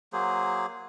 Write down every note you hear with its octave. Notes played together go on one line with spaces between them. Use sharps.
F#3 A#3 G#4 C5